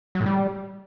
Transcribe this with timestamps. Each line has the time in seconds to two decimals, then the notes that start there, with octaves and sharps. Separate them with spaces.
0.15 F#3
0.20 A2
0.26 G3